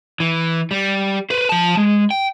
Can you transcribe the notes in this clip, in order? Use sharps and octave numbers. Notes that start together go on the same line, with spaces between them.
E3
G3
B4 C5
F3 A5
G#3
G5